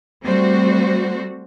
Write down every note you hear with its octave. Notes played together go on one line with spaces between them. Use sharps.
G3 A3 C4 F#4 C5